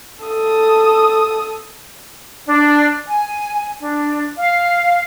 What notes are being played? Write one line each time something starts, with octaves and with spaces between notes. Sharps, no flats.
A4 D#6
D4
G#5
D4
F5